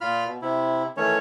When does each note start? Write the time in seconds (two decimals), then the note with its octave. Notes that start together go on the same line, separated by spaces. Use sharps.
0.01 A#2 F4 B5 F6
0.26 B2
0.42 C3 E4
0.97 D#3 E3 A3 C#4 C#5